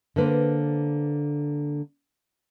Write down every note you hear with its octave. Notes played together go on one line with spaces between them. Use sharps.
D3 A#3 B4 C5